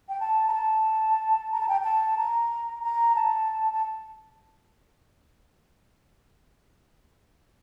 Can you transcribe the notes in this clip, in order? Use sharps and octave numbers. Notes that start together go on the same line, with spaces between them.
G5
A5
A#5
A5
A#5
A5
G5
A5
A#5
A#5
A5
A5